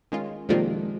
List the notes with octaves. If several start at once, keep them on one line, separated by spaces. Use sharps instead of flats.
D#3 G#3 C#4 F4
C3 D#3 F3 G3 G#3 A#3 F4